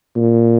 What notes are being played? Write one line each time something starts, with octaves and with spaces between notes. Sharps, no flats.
A#2